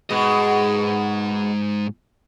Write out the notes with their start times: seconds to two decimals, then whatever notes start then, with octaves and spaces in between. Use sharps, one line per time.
0.10 G#2 B2 G#3 D#5